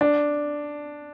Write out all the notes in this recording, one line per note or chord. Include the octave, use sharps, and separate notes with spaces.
D4